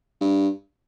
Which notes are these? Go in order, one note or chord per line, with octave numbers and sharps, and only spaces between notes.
G2